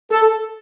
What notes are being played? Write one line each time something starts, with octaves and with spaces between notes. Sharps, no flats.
A4